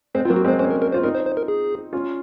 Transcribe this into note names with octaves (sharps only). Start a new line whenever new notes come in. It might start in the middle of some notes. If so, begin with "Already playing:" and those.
G#3 C4 C5
C4 F4
F#3 A#3
F#4
G#3 C4
C5
A#3 C#4 C5
A#4
A#4
F4 C5
C4 D#4 A#4
C5
C5
A#4
G#4
C#4 F4